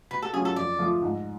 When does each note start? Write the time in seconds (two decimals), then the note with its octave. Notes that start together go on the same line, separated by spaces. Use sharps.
0.11 B2 B4
0.22 A4
0.33 F#3 C#4 F4 G#4
0.45 A4
0.56 F2 D5
0.79 F3 A3 F4
1.02 G#2